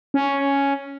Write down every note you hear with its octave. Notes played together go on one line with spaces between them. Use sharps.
C#4